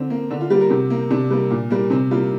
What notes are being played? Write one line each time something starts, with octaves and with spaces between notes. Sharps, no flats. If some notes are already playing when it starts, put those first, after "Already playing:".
Already playing: D3 C4
A#3
D3 D4
F4
G3 A#3 G4
A#4
C3 G4
A#3
C3 D4
G3 A#3
A#2
G3 A#3
C3 C4
G3 A#3 F4